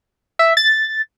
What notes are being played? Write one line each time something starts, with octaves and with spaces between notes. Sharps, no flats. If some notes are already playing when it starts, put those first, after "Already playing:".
E5
A6